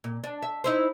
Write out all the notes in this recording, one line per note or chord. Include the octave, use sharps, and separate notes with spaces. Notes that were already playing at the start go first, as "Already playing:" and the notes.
A#2
D4
E5
D#4 E4 C5